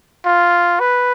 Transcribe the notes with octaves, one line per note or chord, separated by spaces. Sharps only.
F4
B4